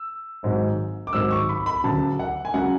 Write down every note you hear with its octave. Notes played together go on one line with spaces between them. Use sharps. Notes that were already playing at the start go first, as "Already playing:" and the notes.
Already playing: E6
G#1 G#2 F#3
D6
G#1 G#2 F#3 E6
C#6
B5
B5
D2 C#3 F#3 A5
F#5
G#5
C#3 F#3 F#5